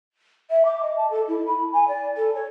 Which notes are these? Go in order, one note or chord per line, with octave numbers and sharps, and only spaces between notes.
E5
D6
D#5
A5
A4
E4
B5
G#5
D5
A4
C#5